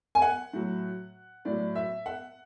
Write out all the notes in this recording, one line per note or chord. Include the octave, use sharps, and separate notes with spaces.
G#5
F#5
A2 F#3
A2 F#3 D5
E5
F#5